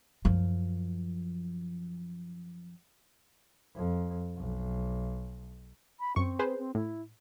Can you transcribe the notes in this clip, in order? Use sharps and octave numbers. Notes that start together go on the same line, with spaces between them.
F#2 F3
F2
B1
B5
F#2 C4 C#6
G#4 B4 C5
C4
A2 E4